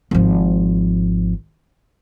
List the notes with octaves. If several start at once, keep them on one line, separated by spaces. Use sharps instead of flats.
G#1 F3